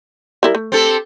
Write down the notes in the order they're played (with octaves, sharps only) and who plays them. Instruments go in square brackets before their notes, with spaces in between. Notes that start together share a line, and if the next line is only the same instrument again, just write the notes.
[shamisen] G3 E4 A#4
A3
[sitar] C4 G4 A4